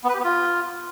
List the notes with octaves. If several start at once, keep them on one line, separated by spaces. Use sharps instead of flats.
B3
B4
G4
B3
F4